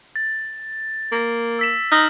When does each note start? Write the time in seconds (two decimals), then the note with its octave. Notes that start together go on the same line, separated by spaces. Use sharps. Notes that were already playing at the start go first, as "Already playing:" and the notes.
0.16 A6
1.12 A#3
1.59 E6 B6 E7
1.92 D#4 F6 F#7